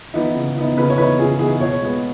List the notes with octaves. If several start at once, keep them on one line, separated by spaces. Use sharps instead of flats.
E3 B3 D#4
C#3
E3 B3 D#4
C#3 B4
C#5
E3 B3 D#4 B4
C#3 G#4
E3 B3 D#4 G#4
B2 C#5
G#3 B3